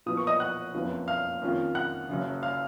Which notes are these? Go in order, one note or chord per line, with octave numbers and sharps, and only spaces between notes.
A#2 F3 B3 D#6
C#6
D#5 D#6
F#5 F#6
F#1 F2 C#3 F3 B3
F5 F6
F2 D#3 A#3 C#4 F4
F#5 F#6
F#1 F#2 C#3
F5 F6